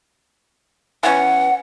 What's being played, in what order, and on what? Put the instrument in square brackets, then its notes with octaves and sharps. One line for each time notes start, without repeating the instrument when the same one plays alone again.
[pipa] E3 B3 C#4 [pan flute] F#5